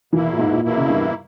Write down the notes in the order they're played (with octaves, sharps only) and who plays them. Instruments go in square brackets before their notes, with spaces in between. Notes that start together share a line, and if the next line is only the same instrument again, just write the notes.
[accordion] E2 B2 A#3 E4 [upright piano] E3
[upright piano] A#2
G#2
A#2
[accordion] E2 B2 A#3 E4
[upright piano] C#3
G2